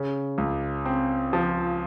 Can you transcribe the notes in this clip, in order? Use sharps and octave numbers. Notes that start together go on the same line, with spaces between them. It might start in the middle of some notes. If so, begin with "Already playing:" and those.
Already playing: C#3
C#2
C4
F3